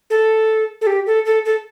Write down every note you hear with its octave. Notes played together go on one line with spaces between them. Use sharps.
A4
A4
G4
A4
A4
A4